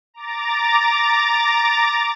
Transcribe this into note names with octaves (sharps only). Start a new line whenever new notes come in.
A#5 D6 A6